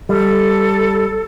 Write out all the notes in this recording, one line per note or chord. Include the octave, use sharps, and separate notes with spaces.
G3 A4